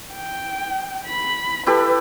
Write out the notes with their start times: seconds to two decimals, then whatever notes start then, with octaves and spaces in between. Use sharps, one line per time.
0.14 G5
1.07 B5
1.66 E4 G4 A4 B4